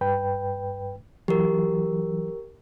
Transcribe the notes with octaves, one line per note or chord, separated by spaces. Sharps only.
G2 B4 G5
E3 F#3 G4 A#4